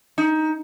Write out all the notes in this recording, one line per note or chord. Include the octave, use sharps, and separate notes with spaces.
D#4